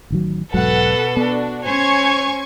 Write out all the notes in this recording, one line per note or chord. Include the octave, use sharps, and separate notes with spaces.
A1 D#3 F#3
E1 G#2 B2 F#3 A4 B4 F#5
B3 D4 F#4
C#4 C5 C#5 G#5 C#6 G#6